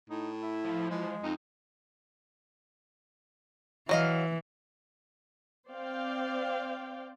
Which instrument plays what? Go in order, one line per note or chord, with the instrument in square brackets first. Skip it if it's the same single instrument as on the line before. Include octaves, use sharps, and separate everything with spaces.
[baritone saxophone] A2 [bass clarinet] D#4
[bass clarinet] E4
[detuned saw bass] F3
[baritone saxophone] E3 [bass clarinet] G#3
[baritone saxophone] F2 [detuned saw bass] D#4
[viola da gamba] E3 [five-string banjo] F#3 D#5 F5
[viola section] C4 C5 D5 F5 G5